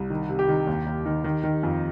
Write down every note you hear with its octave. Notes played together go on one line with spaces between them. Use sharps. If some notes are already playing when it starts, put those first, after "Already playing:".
Already playing: C2
D#3
C3
G4
D#3
D#2
D#2
D#3
D#3
D#3
F2